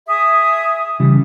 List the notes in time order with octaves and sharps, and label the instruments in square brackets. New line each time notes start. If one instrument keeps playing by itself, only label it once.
[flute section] G#4 E5 D#6
[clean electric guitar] C#3 E3 G3